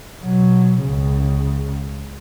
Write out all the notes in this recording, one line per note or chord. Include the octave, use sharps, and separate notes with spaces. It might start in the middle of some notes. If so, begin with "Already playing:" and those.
B2 F#3
C#2 C#3